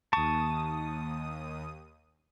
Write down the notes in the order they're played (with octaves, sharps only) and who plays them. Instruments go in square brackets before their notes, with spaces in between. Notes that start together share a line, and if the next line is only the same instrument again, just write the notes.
[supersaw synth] D#2 D#6 [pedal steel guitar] A5 C#6